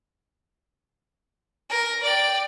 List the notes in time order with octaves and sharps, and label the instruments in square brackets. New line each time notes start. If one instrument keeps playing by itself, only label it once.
[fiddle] A#4
D5 G5